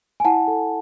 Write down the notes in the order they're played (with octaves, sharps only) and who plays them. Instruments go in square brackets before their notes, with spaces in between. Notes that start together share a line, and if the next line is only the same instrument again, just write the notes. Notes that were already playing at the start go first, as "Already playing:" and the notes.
[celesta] G#5
E4 F#5 A5
A4